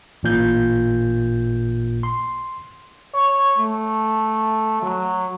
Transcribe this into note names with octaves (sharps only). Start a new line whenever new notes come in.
A1 A#2 G6
C6
C#5
A3
F#3